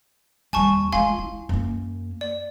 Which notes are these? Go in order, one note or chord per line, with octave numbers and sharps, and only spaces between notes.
D#2 G3 G#5 A5 C#6
G#3 F4 F5 G#5 C6
E4
F#2 A#3
D5